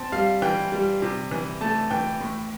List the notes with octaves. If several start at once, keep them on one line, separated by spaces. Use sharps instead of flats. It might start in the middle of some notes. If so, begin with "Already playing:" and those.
Already playing: C4 A5
G3 F5
E3 G5
G3
C3
E3
A3 A5
E3 G5
A2